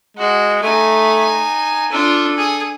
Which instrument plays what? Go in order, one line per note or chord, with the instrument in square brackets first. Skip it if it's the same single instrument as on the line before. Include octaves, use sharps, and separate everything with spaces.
[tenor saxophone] G#3 [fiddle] F#4
[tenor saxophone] A3 [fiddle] D#4 G#5
[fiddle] D4 F4 [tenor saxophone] A4
[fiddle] G#4